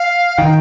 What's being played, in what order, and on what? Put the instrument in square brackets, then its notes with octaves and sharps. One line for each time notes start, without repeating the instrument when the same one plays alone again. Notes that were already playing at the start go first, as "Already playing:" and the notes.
Already playing: [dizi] F5
[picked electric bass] D#3 [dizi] G5